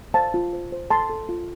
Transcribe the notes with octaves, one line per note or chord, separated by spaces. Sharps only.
C5 F5 A5
F4
C5
C5
A4 A5 C6
A4
F4